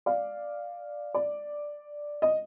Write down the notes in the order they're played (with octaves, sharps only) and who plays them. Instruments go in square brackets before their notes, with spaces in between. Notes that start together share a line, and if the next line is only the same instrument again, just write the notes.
[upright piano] D5 F5
D5
D#5